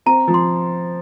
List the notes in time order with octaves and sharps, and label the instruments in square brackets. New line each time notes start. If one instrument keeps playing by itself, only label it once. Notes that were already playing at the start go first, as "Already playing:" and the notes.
[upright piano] C4 [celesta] A#5
[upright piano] F3
[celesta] C6